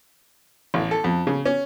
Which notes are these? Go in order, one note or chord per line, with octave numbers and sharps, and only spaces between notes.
A1
A4
F2
C#3
C#4